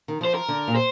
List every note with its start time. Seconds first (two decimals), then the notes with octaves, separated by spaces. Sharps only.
0.08 D#3
0.21 F3 C5
0.35 A#4
0.48 D3
0.68 A#2
0.76 C5